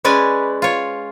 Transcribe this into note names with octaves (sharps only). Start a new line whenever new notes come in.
G#3 C#4 B4 D5 G#5
F4 C#5